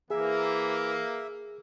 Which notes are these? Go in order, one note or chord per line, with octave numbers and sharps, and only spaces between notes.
E3 A#3 G#4 E5